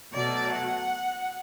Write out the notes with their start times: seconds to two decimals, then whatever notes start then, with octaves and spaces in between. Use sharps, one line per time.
0.13 B2 F#3 A3 D5
0.51 F#5